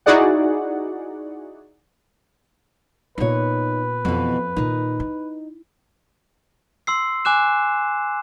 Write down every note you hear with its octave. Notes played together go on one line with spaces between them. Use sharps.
D#4 E4 F#4 G#4 D5 F#5
A#2 B3 D#4 B4 C#5
F2 B2 E3
A#2 D#3 D#4
E4
C6 E6 C7
G#5 D6 F#6 E7